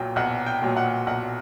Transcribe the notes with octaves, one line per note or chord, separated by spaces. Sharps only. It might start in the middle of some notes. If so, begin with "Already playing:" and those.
Already playing: B1 A#2 F#3 G5
B1 F#5
G5
A#2 F#3
F#5
B1 F#5